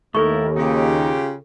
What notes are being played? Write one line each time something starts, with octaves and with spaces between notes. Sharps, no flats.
D#2 A3 E4 A4 A#4 C#6
C#3 D#4 F4 G4